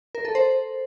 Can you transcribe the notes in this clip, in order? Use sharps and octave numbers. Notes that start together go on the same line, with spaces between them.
A#4
A4
C5